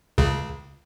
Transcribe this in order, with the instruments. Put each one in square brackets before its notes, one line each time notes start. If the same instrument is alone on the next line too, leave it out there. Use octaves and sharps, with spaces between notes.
[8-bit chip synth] C#2 C#3